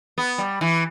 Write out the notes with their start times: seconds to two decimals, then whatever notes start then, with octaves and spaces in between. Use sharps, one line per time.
0.18 B3
0.38 G3
0.61 E3